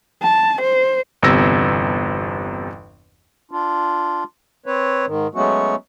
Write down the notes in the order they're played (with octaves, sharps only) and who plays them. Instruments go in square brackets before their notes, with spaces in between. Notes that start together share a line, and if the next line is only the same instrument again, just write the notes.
[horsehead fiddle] A5
C5
[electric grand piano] G1 E2 C3 E6 A#6
[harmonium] D4 F4
C4 B4 C#5
G#2 D#3
F#3 G#3 A3 B3 C#4 F#4